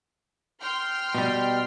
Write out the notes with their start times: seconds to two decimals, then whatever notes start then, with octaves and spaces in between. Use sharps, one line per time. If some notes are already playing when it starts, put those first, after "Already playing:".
0.61 G5 C6 F6
1.15 B2 G3